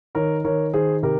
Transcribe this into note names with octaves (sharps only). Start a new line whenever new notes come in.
D#3 A#4 C#5
D#3 A#4 C#5
D#3 G#4 C5
C3 G4 A#4